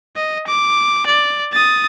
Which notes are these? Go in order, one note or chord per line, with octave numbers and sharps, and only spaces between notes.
D#5
D6
D5
D#6 A6